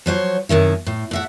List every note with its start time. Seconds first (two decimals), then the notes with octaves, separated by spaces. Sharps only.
0.06 F3 F#3 C5 C#5
0.49 F#2 C3 D#3 E4
0.87 A2
1.11 A2 E5 F#5